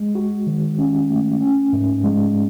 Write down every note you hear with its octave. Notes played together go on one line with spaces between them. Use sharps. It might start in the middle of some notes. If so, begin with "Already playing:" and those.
Already playing: G#3
F#4
D#3
C#4
A3
C#4
G#2
G#3